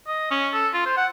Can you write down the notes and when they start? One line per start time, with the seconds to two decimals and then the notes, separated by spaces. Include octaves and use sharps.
0.08 D#5
0.31 C#4
0.53 A4
0.74 F4
0.86 C5
0.97 F#5